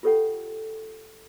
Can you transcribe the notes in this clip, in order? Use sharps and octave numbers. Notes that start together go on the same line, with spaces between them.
F4 G4 A4 C#5 F#5 G5